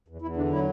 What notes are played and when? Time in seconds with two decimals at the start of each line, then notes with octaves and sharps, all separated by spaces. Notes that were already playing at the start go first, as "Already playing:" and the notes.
0.08 E2
0.22 E2 E4
0.37 D3 D4
0.51 F#3 E4